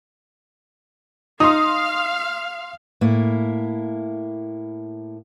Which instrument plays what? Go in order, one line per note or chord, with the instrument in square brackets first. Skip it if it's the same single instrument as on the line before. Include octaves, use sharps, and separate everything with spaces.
[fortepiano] D#4 [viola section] F5 [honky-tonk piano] C6 D#6
[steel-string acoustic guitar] A2 A#3 E4